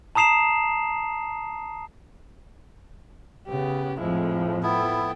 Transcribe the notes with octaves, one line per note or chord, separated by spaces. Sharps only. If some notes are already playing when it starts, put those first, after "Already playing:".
A5 A#5 D#6 C7 E7 F7
C#3 B3 G4
F2 A2 F3 G#3 E4
B3 E4 A4 G5